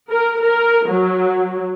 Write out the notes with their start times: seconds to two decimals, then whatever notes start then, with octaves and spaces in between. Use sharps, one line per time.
0.10 A#4
0.42 A#4
0.88 F#3